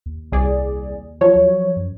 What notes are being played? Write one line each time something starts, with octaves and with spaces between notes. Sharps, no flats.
D#2
C2 G#4 D5
F3 F#3 C#5
F#2